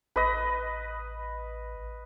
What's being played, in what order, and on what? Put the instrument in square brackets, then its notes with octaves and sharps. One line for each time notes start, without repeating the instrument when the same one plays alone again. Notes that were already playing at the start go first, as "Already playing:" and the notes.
[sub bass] A1 [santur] B4 D#5